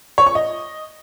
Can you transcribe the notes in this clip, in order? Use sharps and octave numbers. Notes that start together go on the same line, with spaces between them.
C#5
C#6
D#5